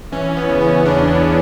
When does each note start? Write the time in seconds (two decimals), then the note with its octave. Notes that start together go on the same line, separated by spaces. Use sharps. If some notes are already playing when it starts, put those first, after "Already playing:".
0.12 E3 C#4
0.37 B3
0.49 C#3
0.61 C#4
0.85 E2 D4